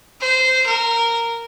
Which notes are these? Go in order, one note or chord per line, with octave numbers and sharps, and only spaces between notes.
C5
A#4